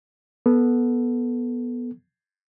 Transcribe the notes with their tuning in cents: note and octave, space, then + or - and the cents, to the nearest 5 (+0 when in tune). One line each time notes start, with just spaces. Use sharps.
B3 -15 A4 -5